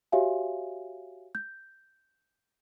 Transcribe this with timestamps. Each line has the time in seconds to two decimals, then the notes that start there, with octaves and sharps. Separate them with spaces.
0.12 F#4 G4 C#5 E5 F5 G#5
1.35 G6